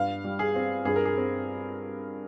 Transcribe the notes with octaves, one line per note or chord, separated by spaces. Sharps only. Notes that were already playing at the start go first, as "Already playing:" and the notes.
Already playing: G2 F5
G3
G#4
C4
G2 G#4
A#4
G#4
C4